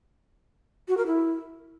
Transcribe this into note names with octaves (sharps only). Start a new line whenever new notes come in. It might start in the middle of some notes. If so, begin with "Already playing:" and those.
F#4
A#4
E4